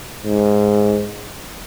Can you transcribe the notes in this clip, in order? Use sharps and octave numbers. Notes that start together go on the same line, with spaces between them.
G#2